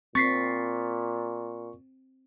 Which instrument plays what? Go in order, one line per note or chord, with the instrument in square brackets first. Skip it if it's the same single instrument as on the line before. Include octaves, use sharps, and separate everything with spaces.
[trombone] A#2 [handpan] C4 [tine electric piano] C#6 [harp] A6 B6 C7